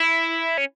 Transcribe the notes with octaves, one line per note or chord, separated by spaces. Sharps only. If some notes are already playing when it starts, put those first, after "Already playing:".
Already playing: E4
C#4